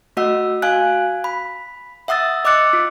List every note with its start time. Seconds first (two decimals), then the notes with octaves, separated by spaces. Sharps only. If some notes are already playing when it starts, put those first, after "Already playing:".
0.17 A3 F#4 D#5 F#5 E6
0.62 F#4 F5 G#5 F#6
1.24 B5
2.08 E5 F#5 D#6 E6 A6
2.45 D#5 D6 E6 F#6 A6 C#7
2.73 F4